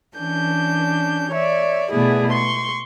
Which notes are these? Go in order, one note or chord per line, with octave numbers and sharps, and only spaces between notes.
E3 C#4 D4 G6
C#5 D5 E5
B2 A3 B3 E4 G#4 D5
C6 C#6